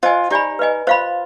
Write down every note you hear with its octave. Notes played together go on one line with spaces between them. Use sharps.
F4 C5 D#5 G#5
D#4 G4 D5 G#5 B5
B4 D#5 G#5
F4 C5 F5 B5